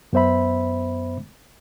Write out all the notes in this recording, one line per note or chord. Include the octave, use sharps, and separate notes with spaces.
F#2 B3 C5 E5 B5